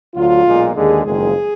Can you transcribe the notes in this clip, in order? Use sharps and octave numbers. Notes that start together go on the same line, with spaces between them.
D2 D3 F#3 F4
B1 A#2 G#3
D#2 D3 G#3 G#4
F#1 F2 D#3 G#3 G#4